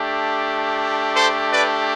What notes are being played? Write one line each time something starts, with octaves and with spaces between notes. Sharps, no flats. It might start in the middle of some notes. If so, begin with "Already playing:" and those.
Already playing: A3 D4 G4
A4 C5
B4 D5